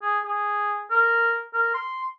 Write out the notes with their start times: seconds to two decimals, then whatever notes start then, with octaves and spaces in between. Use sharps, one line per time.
0.02 G#4
0.25 G#4
0.91 A#4
1.54 A#4
1.74 C6